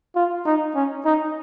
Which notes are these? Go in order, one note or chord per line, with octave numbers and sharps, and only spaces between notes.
F4
D#4
C#4
D#4